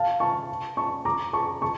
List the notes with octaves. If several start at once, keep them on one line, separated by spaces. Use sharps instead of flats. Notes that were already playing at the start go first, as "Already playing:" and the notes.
Already playing: F5 A5
A5 C#6
A5 C#6
A#5 D6
A5 C#6
A5 C#6